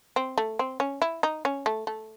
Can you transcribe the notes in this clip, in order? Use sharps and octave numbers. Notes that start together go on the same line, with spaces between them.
C4
A3
C4
C#4
E4
D#4
C#4
A3
A3